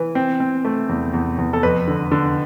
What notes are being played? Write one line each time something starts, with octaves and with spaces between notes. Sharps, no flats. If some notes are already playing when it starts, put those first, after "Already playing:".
Already playing: E3
C4
C4
A3
E2
E2
E2
A4
F2 B4
D3
D3